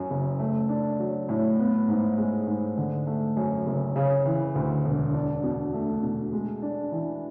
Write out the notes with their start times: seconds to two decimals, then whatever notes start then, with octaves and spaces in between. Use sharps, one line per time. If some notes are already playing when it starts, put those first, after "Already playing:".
Already playing: F#2
0.10 F#1
0.40 A3
0.69 D4
0.99 F#3
1.29 A2
1.59 B3
1.88 G#2
2.18 G#3
2.47 G#2
2.77 D3
3.07 A3
3.37 F#2
3.66 F#1
3.96 C#3
4.26 E3
4.55 D2
4.84 E1
5.14 D4
5.43 B2
5.73 A3
6.03 B2
6.33 G#3
6.62 D4
6.92 E3